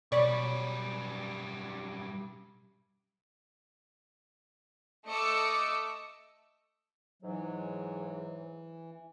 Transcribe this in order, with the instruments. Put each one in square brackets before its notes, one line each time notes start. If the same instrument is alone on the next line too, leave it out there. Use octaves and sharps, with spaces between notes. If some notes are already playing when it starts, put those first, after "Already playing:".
[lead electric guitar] F#2 G3 [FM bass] B2 [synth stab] C#5 D5 B5
[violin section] A3 D#5 D6 E6 C#7
[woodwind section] G#2 F#3 [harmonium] E3